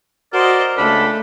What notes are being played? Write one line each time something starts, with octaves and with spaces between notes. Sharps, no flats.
F#4 A#4 C5 D5 D#5
C#2 A3 D4 B5